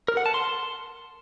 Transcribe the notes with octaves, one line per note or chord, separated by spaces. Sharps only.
A#4
F#5
A5
C6